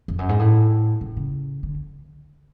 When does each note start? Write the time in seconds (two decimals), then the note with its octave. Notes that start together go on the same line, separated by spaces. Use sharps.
0.08 F2
0.19 F#2
0.29 G#2
0.39 A2
1.01 C3
1.17 C#3
1.63 D3